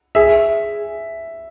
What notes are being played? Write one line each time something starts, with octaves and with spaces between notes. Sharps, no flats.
G#4 E5